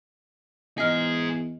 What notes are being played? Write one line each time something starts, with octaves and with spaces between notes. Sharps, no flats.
E2 G#2 G#4 D#5 F6